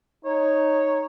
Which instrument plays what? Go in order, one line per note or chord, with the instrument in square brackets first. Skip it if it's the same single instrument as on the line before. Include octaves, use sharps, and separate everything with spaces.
[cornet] D#4 [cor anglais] C#5